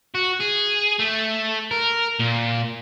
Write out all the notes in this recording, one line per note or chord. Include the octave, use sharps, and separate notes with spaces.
F#4
G#4
A3
A#4
A#2